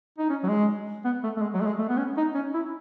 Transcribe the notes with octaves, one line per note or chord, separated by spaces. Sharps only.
D#4
C#4
F#3
G#3
B3
A3
A3
G#3
F#3
A3
G#3
A3
B3
C#4
D#4
C#4
E4